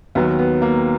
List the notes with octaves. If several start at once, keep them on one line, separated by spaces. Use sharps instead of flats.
D#2 D#3 F#3 B3
B3
A#3